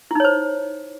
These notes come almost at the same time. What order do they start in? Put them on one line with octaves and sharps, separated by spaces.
E4 D#4 C#5 C5